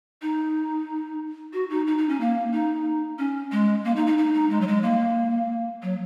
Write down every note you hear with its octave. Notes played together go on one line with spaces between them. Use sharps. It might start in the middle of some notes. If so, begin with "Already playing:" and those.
D#4
F#4
D#4
D#4
D#4
C#4
A#3
D#4
C#4
G#3
A#3
D#4
D#4
D#4
D#4
G#3
F#3
G#3
A#3
F#3